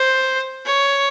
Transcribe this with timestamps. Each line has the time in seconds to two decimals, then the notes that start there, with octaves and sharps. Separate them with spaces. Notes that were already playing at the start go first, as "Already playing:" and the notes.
Already playing: C5
0.65 C#5